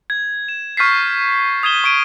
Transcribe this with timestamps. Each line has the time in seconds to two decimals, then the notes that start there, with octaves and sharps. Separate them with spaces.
0.10 G#6
0.48 E7
0.77 C#6 F6 G6 A6 B6 C7
1.63 D#6 G6 G#6 D#7 E7 G7
1.84 C#6 G#6 D7 D#7